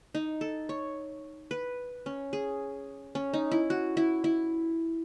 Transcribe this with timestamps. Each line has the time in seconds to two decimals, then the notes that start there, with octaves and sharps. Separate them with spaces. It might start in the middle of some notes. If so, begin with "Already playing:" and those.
0.15 D#4
0.41 A4
0.69 C#5
1.51 B4
2.06 C#4
2.33 G#4
3.15 C#4
3.34 D#4
3.51 E4
3.70 F#4
3.97 E4
4.24 E4